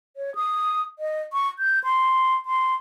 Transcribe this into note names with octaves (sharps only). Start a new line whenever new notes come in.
C#5
D#6
D#5
C#6
G6
C6
C6